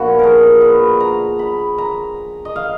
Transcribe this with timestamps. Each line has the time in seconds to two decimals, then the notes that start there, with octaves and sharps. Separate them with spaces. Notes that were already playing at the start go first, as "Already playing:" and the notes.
Already playing: A#2 F3 B3 D4 F#4
0.19 G#4 A#4
0.61 B4
1.00 A#5
1.39 B5
1.78 A#5
2.45 D#5
2.56 F5